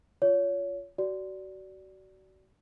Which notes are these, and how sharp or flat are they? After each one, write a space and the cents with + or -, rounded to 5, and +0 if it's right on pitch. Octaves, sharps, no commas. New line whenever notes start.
F4 +0 C#5 +25
F#4 +30 D5 -10